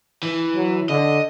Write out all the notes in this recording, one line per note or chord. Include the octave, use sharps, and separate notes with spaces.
E3
F#3
D3 D#5